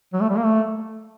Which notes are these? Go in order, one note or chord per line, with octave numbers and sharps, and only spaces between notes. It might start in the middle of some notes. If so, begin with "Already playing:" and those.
F#3
A3
G3
A#3
A3